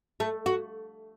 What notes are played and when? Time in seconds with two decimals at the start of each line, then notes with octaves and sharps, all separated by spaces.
0.20 A3
0.46 F#4